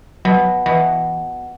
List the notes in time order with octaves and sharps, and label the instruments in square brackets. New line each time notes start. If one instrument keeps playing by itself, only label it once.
[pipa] B2 [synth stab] F#3
[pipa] B2 [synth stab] E3